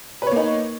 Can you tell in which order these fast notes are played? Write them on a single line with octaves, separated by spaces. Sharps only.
B4 C#5 A#3 D#4